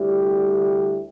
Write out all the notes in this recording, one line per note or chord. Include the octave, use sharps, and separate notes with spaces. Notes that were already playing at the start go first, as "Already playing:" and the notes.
Already playing: D2 D3 G3 E4 G4